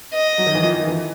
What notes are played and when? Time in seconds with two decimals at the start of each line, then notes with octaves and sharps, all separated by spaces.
0.13 D#5
0.38 F#3
0.46 D#3
0.55 E3
0.63 F3
0.87 E3